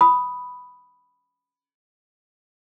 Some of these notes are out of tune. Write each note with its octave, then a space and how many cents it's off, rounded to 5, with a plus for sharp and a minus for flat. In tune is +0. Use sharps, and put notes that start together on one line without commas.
B5 +0 D#6 +0